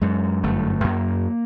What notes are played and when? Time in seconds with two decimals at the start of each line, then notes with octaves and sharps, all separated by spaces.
0.02 F#2 G#3
0.44 G1 A3
0.84 F#2 A#3